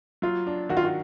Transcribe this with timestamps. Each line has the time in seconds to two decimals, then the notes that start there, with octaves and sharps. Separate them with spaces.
0.22 F#3 F4
0.47 D4
0.69 D#3 F#4
0.77 F4
0.85 F#4